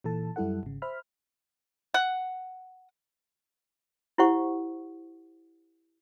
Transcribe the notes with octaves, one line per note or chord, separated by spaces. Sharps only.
A#2 E3 A4 A5
F#2 G3 E4 A4 F#5
G#1 C#3
C5 E5 B5 F6
F#5
E4 G4 C5 F#5 C#6